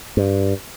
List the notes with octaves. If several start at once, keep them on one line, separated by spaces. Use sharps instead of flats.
G2